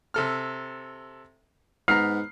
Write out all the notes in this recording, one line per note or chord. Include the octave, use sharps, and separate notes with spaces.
C3 A4 F6
G#2 B3 A#5 F6 C7